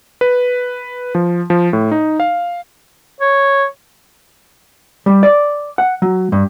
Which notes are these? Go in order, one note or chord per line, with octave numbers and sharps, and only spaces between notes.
B4
F3
F3
A2
D#4
F5
C#5
G3
D5
F#5
F#3
G2